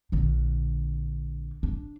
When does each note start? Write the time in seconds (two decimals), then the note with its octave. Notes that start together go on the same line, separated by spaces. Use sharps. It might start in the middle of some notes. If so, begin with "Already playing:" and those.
0.12 A#1 D3
1.63 D4